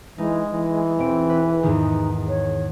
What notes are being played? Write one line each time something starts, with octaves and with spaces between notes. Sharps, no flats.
E3 G#3 D#4
E3 D#5
E1 C4 D7
B4
E2 G#2 D#3 D#4
C#5